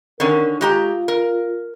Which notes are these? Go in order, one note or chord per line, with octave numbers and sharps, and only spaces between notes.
D3 D#3 C#4 A#4
G#3 F4 G4 A#5
A#4